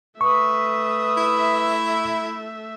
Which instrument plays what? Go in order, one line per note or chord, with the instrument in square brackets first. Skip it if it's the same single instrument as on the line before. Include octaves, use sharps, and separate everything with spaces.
[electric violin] A3 E5 [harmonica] B4 D#6 [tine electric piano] C#6
[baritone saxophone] E4